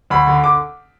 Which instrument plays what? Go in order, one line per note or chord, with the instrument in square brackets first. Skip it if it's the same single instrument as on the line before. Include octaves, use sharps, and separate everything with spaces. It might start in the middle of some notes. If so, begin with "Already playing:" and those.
[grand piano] D2 B5
D3
D6